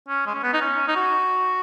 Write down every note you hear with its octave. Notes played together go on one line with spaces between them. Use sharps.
C#4
G#3
C#4
B3
D#4
C#4
D#4
F#4